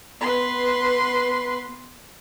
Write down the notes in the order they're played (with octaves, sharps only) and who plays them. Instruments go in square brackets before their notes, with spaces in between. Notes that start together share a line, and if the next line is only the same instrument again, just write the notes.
[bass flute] B3 [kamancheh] B4 C6